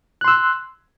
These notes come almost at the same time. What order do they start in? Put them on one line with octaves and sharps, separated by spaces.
F#6 C6 E6